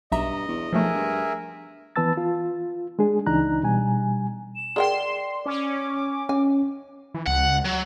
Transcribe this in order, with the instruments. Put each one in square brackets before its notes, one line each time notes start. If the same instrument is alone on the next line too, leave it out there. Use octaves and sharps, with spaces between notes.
[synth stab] B1 E5 A#5 [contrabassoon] G2 [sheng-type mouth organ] D#5
[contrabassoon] E2
[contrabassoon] B1 [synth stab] F3 A3 [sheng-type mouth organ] G#4 A#4 E5
[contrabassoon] G2
[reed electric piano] E3 B3 B4 A5 E6 A6
F4
G#3 D4 G#4
C#2 E3 D4 D#4 A#5 F#6
B2 G3 G#5
[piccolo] E7
[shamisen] G#4 A#4 G5 [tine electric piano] D5 [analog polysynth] C6
[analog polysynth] C#4 [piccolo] D6
[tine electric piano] C#4 [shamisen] G#5
[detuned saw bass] E3
[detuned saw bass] C#2 [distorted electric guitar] F#5
[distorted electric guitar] F#3